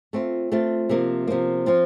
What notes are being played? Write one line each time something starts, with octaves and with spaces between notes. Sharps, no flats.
A3 C4 F4
A3 C4 F4
C3 F3 A#3
C3 F3 A#3
F3 C4 F4